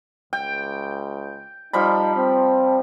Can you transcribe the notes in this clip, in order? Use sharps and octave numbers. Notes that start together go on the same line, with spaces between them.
C#2 G5
F3 G3 D#4 B5
C4